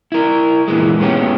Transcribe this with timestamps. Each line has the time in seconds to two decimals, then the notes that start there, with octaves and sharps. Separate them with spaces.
0.12 E4 A#4
0.68 A#2 E3 G#3
1.00 G#3 B3 C#4 G4